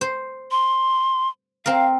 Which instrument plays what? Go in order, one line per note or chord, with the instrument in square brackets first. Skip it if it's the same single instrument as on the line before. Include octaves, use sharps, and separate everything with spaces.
[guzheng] C5
[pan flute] C6
[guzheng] C4 A#4 [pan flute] F5